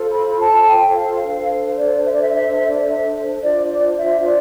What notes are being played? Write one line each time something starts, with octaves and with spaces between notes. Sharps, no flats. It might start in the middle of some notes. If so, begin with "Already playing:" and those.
Already playing: F4 A4 C5
B5
A5
G5
F5
D4 A4 C5
D5
E5
D5
E5
E5
E5
D5
E5
D4 F4 C5 D5
D5
E5
D5